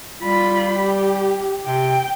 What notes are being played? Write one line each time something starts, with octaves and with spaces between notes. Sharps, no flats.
G3 F4 B5
G4
C3 G5